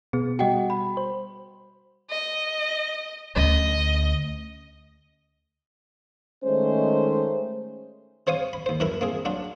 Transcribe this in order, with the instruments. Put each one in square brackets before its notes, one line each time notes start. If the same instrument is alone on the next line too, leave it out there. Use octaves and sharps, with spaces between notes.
[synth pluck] B2 B3 [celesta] G#4
[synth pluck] G3 F#4 [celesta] D#5 F#5 G5
[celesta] B5
[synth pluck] C5
[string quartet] D#5
[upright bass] D2 C#4 [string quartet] D#5
[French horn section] D#3 G#3 A3 C#4 C5
[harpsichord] C3 C5 C#5 F5 D#6
B5
D#2 C5
F#2 E3 E4 A#4 A#5 B5
A#3 C4 G#4
F#3 D4 F4